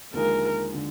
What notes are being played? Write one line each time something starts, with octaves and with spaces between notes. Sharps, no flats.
D#2 D3 F3 G#3 D#4 A#4
D3